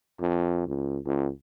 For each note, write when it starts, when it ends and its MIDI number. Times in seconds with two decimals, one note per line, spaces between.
0.21 0.65 41
0.67 0.98 37
1.06 1.30 37